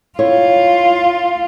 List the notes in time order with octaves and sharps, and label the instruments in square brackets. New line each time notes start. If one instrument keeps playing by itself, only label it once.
[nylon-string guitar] E4 C#5 [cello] F4